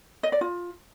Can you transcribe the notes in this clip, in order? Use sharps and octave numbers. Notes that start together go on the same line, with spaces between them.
D#5
D5
F4